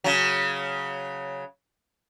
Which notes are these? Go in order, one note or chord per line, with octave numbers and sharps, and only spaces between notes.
C#3 F#3